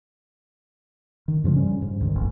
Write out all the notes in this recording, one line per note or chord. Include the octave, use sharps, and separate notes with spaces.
D#3
G2 C#3 F3 G#3
G3 C#4
G#2
D2 G#2 D#3
E1 A1 F2